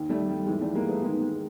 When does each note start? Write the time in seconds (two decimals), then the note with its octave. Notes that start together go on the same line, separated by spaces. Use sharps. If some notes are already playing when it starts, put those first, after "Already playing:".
Already playing: D#2 D#3
0.09 G3 A3
0.29 G3
0.47 G#2 E3 G#3
0.60 G3 A3
0.75 G#3 A#3
0.88 A3 B3
1.02 G#2 G#3 A#3
1.06 D#3
1.21 G#3